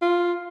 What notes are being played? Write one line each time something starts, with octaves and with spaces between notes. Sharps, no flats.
F4